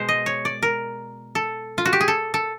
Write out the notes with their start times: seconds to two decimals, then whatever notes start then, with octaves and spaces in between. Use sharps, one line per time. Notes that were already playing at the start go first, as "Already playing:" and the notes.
Already playing: B2 G#3 C5
0.09 D#5
0.26 C#5
0.45 D5
0.62 A#4
1.35 A4
1.78 F4
1.85 F#4
1.93 G4
2.01 G#4
2.08 A4
2.34 A4